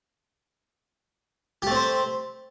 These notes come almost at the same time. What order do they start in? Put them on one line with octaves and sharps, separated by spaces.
G4 A3 C4 C5